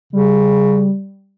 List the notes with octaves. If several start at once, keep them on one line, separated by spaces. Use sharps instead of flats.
C#3 G3